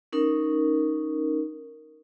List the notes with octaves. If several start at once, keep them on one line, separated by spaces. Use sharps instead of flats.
C#4 D#4 A#4